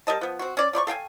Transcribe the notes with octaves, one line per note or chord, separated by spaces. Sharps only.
G3 A#4 D#5 A5
F3 B3
C4 F#4
C#4 D5
F3 D5 B5 C#6
A4 F5 G5 G#5